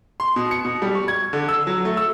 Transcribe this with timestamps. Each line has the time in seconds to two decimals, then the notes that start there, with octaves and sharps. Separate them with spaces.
0.20 C6
0.36 B2
0.51 C#7
0.65 B2
0.82 G3
0.95 C#6
1.08 G#6
1.33 D3
1.48 E6
1.67 F#3
1.85 A3
1.97 E6